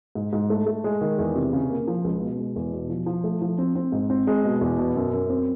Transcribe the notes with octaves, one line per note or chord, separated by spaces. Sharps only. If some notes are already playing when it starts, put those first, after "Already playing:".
G#2
G#2
A3
A3
G#3
D#3
E2
C3
C#3
A#3
F3
C#2
B2
G#3
E2
B2
F3
F3
A3
F3
C4
C4
G#2
C4
G#3
B2
E2
B2
F#2
F#2
C4